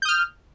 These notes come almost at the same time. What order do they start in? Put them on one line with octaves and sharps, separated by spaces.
G6 D#6 F6